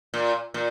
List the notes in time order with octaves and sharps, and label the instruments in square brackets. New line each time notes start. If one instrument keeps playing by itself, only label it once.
[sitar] A#2
A#2